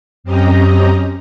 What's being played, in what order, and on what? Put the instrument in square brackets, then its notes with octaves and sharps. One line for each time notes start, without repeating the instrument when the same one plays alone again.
[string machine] F#2 C4 C#4 G4 D#5 A#5